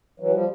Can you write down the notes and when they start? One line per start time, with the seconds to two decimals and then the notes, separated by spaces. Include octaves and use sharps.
0.20 E3 F#3
0.33 F3 G3